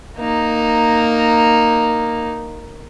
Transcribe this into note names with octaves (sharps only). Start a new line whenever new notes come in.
A#3 D#4